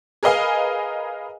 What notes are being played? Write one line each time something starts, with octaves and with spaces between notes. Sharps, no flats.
G#4 A#4 B4 D#5 F5 G#5